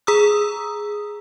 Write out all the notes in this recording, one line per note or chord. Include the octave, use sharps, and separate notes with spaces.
G#4 A#5 D#6 E6